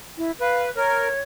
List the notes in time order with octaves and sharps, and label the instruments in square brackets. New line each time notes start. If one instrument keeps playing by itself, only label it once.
[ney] E4
[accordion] B4 [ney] F5
[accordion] A#4 [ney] C#5